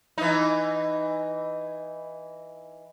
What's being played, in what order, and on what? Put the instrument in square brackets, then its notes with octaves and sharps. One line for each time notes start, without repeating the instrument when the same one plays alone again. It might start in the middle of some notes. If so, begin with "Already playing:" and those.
[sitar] E3 D#4